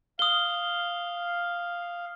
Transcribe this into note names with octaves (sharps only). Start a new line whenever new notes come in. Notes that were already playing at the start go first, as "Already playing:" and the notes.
F5 D#6 G7